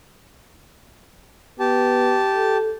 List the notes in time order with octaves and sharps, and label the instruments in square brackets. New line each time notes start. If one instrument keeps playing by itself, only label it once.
[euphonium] B3 [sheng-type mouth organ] G4 A5
[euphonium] A4